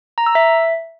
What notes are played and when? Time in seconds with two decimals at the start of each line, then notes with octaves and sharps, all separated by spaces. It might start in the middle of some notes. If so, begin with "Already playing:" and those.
0.18 A#5
0.26 E6
0.35 E5